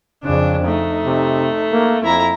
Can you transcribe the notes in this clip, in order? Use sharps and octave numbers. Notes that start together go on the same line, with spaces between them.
F2 C#3 D4
A3 D#4
C3
A#3
F2 E4 A#5